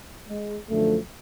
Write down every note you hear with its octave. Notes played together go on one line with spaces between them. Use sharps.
G#3
F#2 D3 F3 A3